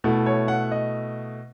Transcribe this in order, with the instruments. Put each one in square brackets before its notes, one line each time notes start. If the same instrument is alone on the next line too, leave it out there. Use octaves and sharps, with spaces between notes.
[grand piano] B2 A3 E4
C#5
F#5
D#5